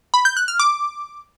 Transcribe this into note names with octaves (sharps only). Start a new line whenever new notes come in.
B5
G6
F#6
F6
D6